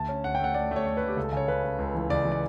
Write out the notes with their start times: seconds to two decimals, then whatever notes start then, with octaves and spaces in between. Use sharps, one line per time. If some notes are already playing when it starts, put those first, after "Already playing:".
Already playing: D2 A5
0.09 C#4
0.24 D2 F#5
0.35 A3 G5
0.44 F#5
0.54 A3 D5
0.71 A3 C#5
0.87 A3
0.97 A3 B4
1.08 G4
1.16 C#2 A4
1.33 C#3 C#5
1.48 C#3 B4
1.64 C#3
1.79 C#2
1.95 E3
2.10 C#2 D5
2.25 E3
2.32 D5